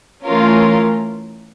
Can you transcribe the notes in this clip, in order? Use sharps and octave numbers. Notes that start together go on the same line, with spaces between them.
E3 A3 C#4 F4 A#4